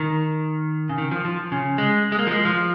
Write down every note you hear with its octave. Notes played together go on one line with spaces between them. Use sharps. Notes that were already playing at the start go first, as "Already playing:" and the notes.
Already playing: D#3
C#3
D#3
F3
F3
C#3
G#3
G#3
A#3
F3
G#3
F3